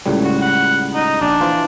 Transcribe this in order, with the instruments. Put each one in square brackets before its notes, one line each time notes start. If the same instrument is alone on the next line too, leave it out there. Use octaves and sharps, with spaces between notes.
[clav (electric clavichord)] C#2 A2 G3
[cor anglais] F#4
F#5
D#4
[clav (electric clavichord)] A#1 [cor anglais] D4
[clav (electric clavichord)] E3 F4 C5